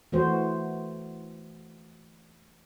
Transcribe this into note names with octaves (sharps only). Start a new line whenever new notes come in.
E3 A3 F#4 C5